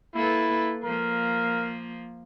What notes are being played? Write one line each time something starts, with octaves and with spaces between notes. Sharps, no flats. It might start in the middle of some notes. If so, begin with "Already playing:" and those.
A#3 E4 A4 B4
F3 A#3 A#4